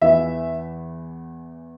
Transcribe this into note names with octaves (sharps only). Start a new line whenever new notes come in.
E2 E3 E5